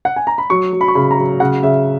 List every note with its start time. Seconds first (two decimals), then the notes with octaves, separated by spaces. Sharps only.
0.05 F#5
0.16 G#5
0.27 A#5
0.38 B5
0.50 F#3 C#6
0.73 F#3
0.81 B5
0.88 C#6
0.95 C#3 B5
1.11 A#5
1.18 F#3
1.40 C#3 F#5
1.63 C#3 E5